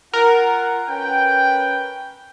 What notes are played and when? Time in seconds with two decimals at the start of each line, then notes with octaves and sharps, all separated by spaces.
0.14 F4 A#4 F#5
0.88 C#4 B4 G5